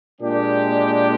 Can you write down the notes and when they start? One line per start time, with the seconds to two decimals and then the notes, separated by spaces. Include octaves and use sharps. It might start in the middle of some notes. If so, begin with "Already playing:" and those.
0.20 A#2 G#3 D4 G4